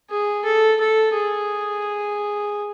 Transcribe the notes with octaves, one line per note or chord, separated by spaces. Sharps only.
G#4
A4
A4
G#4